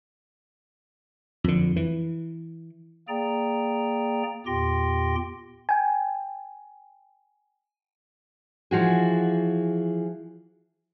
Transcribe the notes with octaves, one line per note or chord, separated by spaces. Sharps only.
F2 D3
E3
A#3 G#4 D5 G5 A#5
E2 A#2 G4 G5 C6 A#6
G5 G#5
E3 F3 F#4 G#4